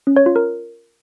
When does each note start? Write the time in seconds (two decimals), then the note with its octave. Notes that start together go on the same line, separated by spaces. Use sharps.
0.07 C#4
0.16 C#5
0.26 F4
0.36 A#4